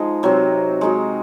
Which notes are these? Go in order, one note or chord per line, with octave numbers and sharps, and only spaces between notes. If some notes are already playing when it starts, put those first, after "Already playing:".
Already playing: F3 G#3 D#4
C3 F#3 C4
G#3 D#4 F#4